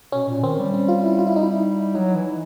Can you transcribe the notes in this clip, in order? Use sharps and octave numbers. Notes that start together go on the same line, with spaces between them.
B2 C#4
A#2
D#3 C4
G3
C#4
F4
E4
F4
E4
D#4
E4
F#3 D#4
E3